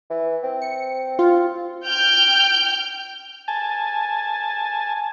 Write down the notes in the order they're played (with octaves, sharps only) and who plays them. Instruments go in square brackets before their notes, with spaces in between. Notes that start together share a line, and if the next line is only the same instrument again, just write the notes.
[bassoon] E3
C4
[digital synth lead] C#7
F4
[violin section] G5 F6 G6
[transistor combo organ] G#5 A5